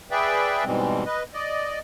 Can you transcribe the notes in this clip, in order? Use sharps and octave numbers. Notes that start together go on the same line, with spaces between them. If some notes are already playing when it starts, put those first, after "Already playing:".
G#4 B4 D5 E5 G5
G#2 B2 E3 G3 G#3 C4
B4 D#5
D5 D#5